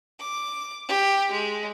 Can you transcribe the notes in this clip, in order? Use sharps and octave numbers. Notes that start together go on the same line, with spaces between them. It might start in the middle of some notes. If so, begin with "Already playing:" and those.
D6
G4
G#3